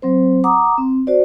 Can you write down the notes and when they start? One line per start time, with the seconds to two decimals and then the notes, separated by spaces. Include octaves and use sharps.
0.02 F#3 C4 C5
0.44 F#5 A#5 D6 D#6
0.78 C4
1.07 F#4 C5 D5